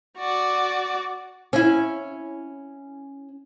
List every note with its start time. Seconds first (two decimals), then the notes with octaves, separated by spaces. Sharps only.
0.18 F#4 D5
1.53 C#4 E4